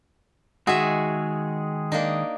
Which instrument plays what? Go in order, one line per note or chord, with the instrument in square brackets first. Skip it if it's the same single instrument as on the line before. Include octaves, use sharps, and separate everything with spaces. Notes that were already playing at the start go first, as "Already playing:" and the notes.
[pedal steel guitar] D#3 G#3 G#4 [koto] F#4 E5
[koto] A#3 D4 D#4